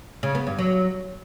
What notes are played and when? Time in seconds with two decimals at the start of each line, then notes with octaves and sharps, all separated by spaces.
0.23 C#3
0.35 B3
0.47 G2
0.58 F#3